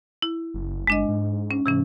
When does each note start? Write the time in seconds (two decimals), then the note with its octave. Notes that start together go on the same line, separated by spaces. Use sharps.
0.22 E4
0.54 F#1
0.87 G1 G#3 D4 D#5
1.09 G#2
1.51 C#4
1.66 G#2 C3 E3 C#4